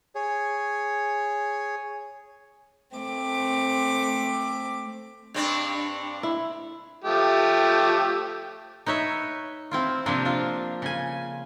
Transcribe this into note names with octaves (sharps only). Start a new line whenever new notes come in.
G#4 C#5
A3 C4 D6
G2 C4 D4
E4
F3 A3 G4
D#4 B4 C#5 E5
C4 E4 F4
C3 F3 A#3 C4 D4
D4 F4
C#3 G#5